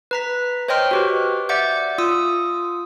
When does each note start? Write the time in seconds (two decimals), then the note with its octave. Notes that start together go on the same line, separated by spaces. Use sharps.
0.11 B4 A#5 B6
0.68 C5 C#5 D#5 G5 C6 F6
0.91 F#4 G4 B4
1.49 D5 E5 F#5 D6 G6
1.98 F4 D#6 E6